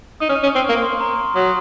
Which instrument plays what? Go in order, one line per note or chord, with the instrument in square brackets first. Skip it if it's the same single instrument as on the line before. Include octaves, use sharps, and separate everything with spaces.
[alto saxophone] D#4 [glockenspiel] D#6
[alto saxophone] C#4 [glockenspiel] F6
[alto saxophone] C#4
[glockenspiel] D#6
[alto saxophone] C4
[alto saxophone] A#3 [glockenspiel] C#6
[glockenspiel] C6
A#5
C6
[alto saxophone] F#3 [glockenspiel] D#6